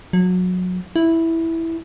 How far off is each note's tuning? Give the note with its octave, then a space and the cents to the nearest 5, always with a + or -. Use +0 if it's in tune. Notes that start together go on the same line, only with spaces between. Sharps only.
F#3 -25
E4 -5